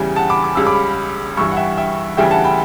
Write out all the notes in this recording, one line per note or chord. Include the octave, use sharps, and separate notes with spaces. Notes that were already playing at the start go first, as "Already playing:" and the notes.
Already playing: E2 C#3 E3 G3 G5
F#5 A5
B5 D6
D6
C#2 C#3 G3 E6
B5 D6
G2 E3 G3 C#6 E6
F#5
E5 G5
E5 G5
D2 C#3 E3 G3 E5 G5
F#5 A5
G5 B5